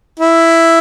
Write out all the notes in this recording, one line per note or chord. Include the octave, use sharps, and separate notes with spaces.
E4